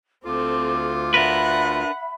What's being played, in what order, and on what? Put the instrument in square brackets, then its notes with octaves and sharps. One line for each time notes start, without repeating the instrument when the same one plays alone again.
[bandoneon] D2 F4 [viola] C4 A4 [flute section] D6
[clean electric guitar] D4 A#4 B4 [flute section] E5 B5 [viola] F#5